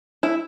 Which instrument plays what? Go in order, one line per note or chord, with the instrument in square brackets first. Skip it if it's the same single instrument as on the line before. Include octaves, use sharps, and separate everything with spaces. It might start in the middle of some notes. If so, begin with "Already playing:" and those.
[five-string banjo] E4